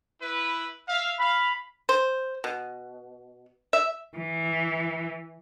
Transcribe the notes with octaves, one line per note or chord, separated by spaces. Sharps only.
E4 B4
E5 F5
F5 B5
C5
B2
E5
E3